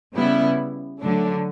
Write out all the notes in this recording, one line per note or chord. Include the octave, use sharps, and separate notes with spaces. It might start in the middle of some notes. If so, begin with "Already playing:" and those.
C#3 G3 B3 E4
D3 F#3 A3 D4